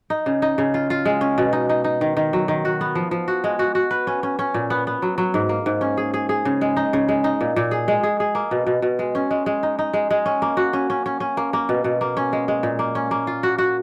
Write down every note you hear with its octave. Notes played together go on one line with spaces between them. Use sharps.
D#4
C#3
D#4
C#3
F4
F4
G#3
C#4
B2
D#4
D#4
D#4
D#3
D#3
F#3
D#3
F#4
B3
F3
F3
F#4
G#3
F#4
F#4
B4
C#4
C#4
C#4
A#2
B3
B3
F#3
F#3
G#2
A#3
G#2
C#4
G#4
G#4
G#4
C#3
G#3
D#4
C#3
G#3
D#4
A#2
A#2
G#4
G#3
G#4
G#4
A#3
B2
B2
B2
G#3
C#4
G#3
G#3
D#4
D#4
G#3
G#3
C#4
A#3
F#4
C#4
C#4
C#4
C#4
A#3
A#3
B2
B2
A#3
C#4
G#3
G#3
A#2
A#3
C#4
A#3
F4
F#4
F#4